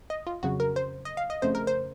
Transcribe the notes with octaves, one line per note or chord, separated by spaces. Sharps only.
D#5
F4
F2 C#3 F#3 F#4
A#4
C5
D#5
F5
D#5
F2 C#3 A3 C5
A#4
C5